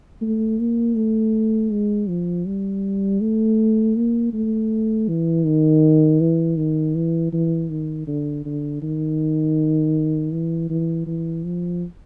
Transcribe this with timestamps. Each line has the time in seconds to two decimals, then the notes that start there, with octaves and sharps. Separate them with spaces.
0.21 A3
0.59 A#3
0.96 A3
1.71 G#3
2.09 F3
2.46 G3
3.21 A3
3.96 A#3
4.33 A3
5.08 E3
5.46 D#3
6.21 E3
6.57 D#3
6.95 E3
7.33 E3
7.70 D#3
8.07 D3
8.45 D3
8.82 D#3
10.32 E3
10.70 E3
11.07 E3
11.45 F3